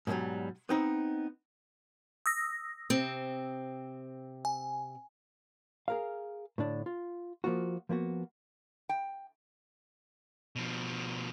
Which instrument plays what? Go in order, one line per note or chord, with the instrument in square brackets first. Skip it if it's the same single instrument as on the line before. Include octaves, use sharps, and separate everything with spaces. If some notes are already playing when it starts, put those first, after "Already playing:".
[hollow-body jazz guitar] G#2 B2 D#3 F#3 G3
B3 C4 D#4
[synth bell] D#6 E6 A#6
[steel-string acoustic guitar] C3 C4
[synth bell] G#5
[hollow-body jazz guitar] G#4 A#4 F5
A2 D3 D4
F4
F3 A#3 F4 F#4
F3 A#3 B3 F#4
[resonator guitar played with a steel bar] G5
[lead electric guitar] B2 F3